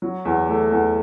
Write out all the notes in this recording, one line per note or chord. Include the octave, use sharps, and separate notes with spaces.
F#3
E2
A3
E2